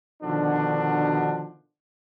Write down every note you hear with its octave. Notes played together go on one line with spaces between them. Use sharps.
B2 D3 D#3 F3 D4 F#4